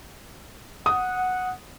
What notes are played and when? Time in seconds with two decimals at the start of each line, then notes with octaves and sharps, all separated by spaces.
0.86 F#5 D#6